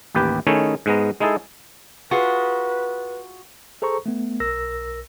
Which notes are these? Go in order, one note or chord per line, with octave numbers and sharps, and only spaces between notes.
A1 D#2 G4 B4 G5
D#3 A3 C#4 D#4 E4 G#4
G#2 G#3 B3 A#5
G#3 D#4 E4 G#4 A4
F4 F#4 G#4 B4
G#4 A4 C5 A#5 C#6
A3 B3
B1 A#4 E6 A#6